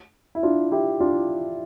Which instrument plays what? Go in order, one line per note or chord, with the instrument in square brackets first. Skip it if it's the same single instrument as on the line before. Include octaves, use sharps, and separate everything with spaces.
[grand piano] E4
D4 F4
E4 G4
D4 F4